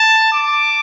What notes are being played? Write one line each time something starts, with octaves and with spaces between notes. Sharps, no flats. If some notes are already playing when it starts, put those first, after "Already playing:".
Already playing: A5
D6